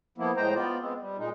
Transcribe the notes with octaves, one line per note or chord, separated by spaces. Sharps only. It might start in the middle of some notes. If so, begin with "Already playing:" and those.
F3 A#3 B3 E4
A2 G#3 C5 G5 A#5
B3 F4 D5
G#3 B3 C4
G3
A#2 G#3 D#4